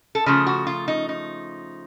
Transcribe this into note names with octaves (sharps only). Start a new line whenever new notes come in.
A4
C#3 F3 A3 G#4
F#4
F4
D#4
D#4